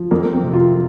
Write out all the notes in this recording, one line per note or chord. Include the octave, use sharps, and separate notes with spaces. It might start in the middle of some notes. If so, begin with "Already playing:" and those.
Already playing: F3
F2 A#3
A#3
C4
C3
F4